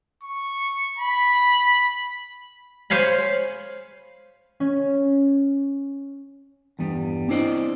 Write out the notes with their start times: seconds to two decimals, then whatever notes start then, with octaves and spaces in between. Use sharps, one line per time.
0.23 C#6
0.98 B5
2.90 C5 C#5 F5 G#5 B5
4.60 C#4
6.79 E2 G2 G3 B3
7.28 C4 D4 E4 C5 D5 D#5